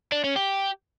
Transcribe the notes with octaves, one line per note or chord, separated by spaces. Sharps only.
D4
C#4
G4